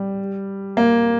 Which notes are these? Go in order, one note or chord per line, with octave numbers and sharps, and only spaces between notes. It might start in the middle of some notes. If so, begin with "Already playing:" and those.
Already playing: G3
A#3